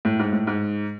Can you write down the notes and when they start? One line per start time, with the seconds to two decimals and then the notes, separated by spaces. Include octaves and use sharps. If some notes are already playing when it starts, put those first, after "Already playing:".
0.05 A2
0.19 G#2
0.33 A2
0.47 G#2